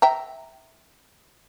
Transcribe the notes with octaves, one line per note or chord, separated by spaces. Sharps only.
E5 G5 A#5